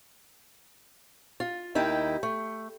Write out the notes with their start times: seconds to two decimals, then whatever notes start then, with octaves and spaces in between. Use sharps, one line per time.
1.40 F4
1.75 D#2 D#3 E4 G5
2.23 A3